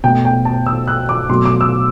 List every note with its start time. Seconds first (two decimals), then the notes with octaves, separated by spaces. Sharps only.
0.04 B2 A3 G5
0.25 G5
0.45 A5
0.66 E6
0.88 F#6
1.09 D6
1.29 B2 F#3 A3 C6
1.45 D6
1.61 E6